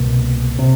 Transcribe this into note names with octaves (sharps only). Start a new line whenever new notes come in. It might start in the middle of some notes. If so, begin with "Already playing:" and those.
Already playing: C2 B2 A#3
C3